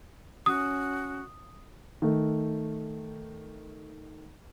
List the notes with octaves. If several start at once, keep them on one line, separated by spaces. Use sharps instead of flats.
C#4 F#4 D#6
D#3 A3